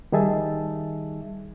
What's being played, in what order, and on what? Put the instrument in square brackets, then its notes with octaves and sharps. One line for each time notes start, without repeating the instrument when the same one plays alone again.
[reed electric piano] D#3 G3 D#4 G#4 E5 A5